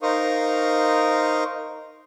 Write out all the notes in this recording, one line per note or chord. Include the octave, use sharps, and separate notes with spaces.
D#4 A#4 C5 F5 C#6 D#6